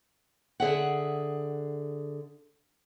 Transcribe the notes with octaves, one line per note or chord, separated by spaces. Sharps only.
D3 G#4 E5 F#5